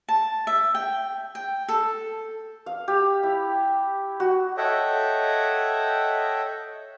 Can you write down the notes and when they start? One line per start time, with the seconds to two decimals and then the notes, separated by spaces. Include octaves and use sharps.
0.09 A5
0.47 E5
0.75 G5
1.35 G5
1.69 A4
2.66 F5
2.88 G4
3.23 E4
4.20 F#4
4.57 A4 C#5 D#5 E5 F#5 G5